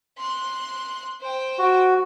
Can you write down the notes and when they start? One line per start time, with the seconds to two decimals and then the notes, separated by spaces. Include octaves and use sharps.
0.18 C6 F#6
1.21 C5 G5
1.59 F#4